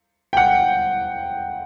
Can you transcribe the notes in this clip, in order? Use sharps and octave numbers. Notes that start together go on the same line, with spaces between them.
G5
F#5